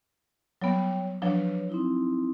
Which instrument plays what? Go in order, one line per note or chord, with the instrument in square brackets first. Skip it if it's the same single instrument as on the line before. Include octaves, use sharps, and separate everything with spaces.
[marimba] F#3 G3 B3 [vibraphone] C#5 G5
[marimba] F3 F#3 D4 [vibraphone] B4 C#5
[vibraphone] C4 D#4 E4